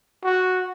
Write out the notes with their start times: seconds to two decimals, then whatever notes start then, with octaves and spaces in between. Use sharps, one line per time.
0.24 F#4